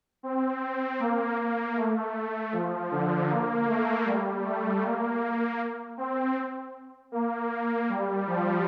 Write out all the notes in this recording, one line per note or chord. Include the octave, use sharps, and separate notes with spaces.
C4
A#3
A#3
A3
F3
D3
A#3
A3
G3
A3
A#3
C4
A#3
A#3
G3
F3